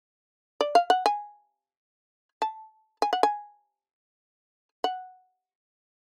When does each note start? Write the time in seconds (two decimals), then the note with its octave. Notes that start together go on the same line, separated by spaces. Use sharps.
0.61 D5
0.75 F5
0.90 F#5
1.06 G#5
2.42 A5
3.02 G#5
3.13 F#5
3.23 G#5
4.84 F#5